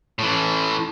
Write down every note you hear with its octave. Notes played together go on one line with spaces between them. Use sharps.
A2 E3